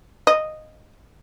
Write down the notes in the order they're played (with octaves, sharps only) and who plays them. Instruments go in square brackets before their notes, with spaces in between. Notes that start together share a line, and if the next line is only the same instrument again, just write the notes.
[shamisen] D#5